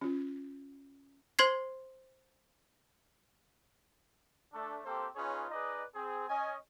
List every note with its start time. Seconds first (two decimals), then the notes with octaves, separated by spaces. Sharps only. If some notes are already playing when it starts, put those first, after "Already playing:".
0.01 C#4 F4
1.39 C5 C6 G#6 C7
4.53 A3 D4 A4
4.85 A#3 C4 G4 A4 C5
5.16 C#4 D#4 F4 G#4 B4 C#5
5.50 D#4 G#4 B4 D5 D#5
5.94 C4 G#4
6.28 C#4 D#5 G#5